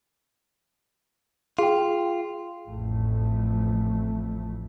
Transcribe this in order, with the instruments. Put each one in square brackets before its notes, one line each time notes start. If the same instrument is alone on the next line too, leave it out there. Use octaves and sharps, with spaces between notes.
[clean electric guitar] F4 [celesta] G#4 G5
[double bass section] A1 F2 A3